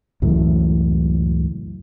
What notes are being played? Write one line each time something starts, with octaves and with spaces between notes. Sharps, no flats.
C#2 F#2 A2 E3